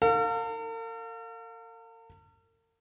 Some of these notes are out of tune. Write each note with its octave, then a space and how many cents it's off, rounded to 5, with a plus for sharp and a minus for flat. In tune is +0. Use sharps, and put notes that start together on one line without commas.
A#4 -45 F5 +25